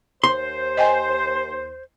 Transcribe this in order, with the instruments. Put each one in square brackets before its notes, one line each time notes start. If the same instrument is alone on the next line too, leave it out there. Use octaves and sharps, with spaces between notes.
[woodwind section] D#2 C5 [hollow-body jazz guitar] C6
[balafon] D#5 G5 G#5